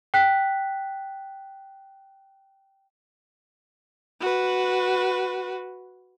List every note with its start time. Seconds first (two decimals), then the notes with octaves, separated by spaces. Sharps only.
0.14 G5 F#6 B6
4.21 F#4 B4